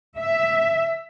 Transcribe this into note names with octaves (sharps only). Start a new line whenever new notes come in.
E5